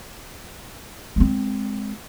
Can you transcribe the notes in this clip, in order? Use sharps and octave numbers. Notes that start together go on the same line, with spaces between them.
G#3 C4